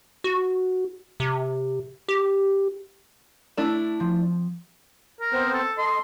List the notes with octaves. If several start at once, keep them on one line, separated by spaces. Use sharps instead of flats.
F#4
C3
G4
A3 D4 E4 E7
F3 C4
A#4
B3 C4 C5
A4
A4 D#5 C6